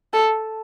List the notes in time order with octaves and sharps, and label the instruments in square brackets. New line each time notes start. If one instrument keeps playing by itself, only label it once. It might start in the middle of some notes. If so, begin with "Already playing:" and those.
[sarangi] A4